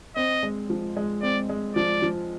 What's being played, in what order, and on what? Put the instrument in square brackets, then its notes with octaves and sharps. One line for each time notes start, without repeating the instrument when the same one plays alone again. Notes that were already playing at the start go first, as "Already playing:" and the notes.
[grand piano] C4 [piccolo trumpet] D#5
[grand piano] G#3
F3
G#3
[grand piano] C4 [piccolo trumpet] D5
[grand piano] G#3
[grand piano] F3 [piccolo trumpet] D5
[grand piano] F3